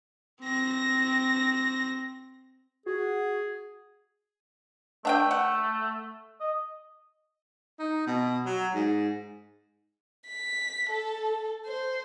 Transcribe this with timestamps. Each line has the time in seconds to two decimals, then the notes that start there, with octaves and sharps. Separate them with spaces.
0.41 C4 A#6
2.86 F#4 G#4
5.05 A3 D4 F#5 G5
5.31 F#5
6.40 D#5
7.79 D#4
8.07 B2
8.46 F#3
8.74 G#2
10.27 B6
10.90 A4
11.66 C5